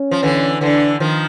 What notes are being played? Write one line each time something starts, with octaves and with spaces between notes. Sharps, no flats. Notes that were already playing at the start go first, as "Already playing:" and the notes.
Already playing: C#4
F3
D3 E3
D3 E3 D4
D#3 F3